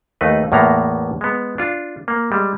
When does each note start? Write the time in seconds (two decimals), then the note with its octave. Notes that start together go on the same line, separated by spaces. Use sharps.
0.21 D#2 A3 D#4 B4
0.52 E2 A2 A#3 B3 A#5
1.21 G#3 B3
1.58 D4 F4
2.08 A#3
2.32 G3 G#3